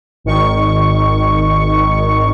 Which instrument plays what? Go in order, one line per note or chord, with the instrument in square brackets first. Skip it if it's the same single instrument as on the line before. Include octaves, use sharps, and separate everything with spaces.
[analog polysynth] G#1 D#3 C#6